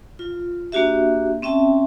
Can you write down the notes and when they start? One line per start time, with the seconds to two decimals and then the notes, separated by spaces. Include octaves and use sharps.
0.19 F4
0.72 A#3 D4 F#4 G4 E5
1.42 C4 C#4 E5 G5 A5